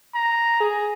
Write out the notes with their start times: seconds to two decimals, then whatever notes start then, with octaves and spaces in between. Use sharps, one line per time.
0.15 A#5
0.61 G#4